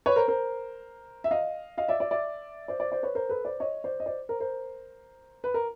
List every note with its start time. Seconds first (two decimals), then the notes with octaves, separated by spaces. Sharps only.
0.06 B4 C#5
0.16 A#4 C5
0.28 A#4 C5
1.24 E5
1.31 D#5 F5
1.78 D#5 F5
1.88 D5 E5
2.00 D5 E5
2.11 D5 E5
2.68 C5 D5
2.80 C5 D5
2.92 C5 D5
3.03 B4 C#5
3.15 A#4 C5
3.29 A4 B4
3.45 C5 D5
3.60 C#5 D#5
3.84 C5 D5
4.00 D#5
4.06 C5 D5
4.29 A#4 C5
4.40 A#4 C5
5.44 B4
5.54 A#4